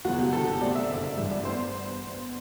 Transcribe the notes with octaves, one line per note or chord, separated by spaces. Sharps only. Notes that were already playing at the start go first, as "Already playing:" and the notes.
F#1 E2 B2 F#3 B3 F#4
G4
E2 D3 F#3 A4
G4
C2 B2 A3 C4 D5
E5
F#1 F#2 D3 D5
E5
A1 G2 E3 G3
D5
B3 C5